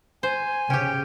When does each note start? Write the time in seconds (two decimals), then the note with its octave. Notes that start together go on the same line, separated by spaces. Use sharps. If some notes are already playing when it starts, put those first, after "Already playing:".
0.23 C5 G#5
0.70 C#3 C#4 G4 G5